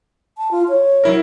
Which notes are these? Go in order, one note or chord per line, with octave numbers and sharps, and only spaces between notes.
A5
F4
C#5
F#3 E4 A#4